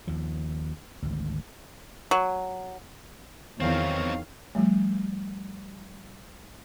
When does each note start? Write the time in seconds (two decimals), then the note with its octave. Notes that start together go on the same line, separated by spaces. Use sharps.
0.07 D#2 F3
1.02 G#1 D2
2.11 F#3
3.60 E2 D#3 F#3 C4 C#5 F5
4.55 F3 G3 A3